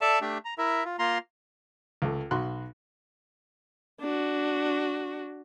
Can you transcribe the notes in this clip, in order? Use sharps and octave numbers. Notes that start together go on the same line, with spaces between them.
A4 D5 E5 A5
A3 D4 G4 E5
A#5
E4 A#4 E5
F4
A#3 F4 A#5 C6
C#2 A3
B1 F#4 B5 C6 F#6
D4 F#4